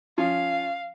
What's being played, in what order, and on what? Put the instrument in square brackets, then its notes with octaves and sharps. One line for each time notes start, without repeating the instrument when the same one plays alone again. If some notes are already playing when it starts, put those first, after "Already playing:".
[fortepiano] F3 C#4 F4 [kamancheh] F5